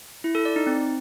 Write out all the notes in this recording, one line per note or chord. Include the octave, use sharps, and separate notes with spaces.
E4
A4
D5
D#4
C4